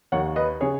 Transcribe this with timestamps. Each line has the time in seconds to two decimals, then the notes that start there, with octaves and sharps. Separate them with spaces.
0.12 D#2 D#3 C#5 F#5
0.36 B4 D#5
0.61 C#3 G#4 C#5